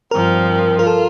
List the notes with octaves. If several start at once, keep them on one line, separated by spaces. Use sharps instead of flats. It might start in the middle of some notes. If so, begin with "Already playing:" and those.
G2 F3 C4 A#4
F4 A#4
A4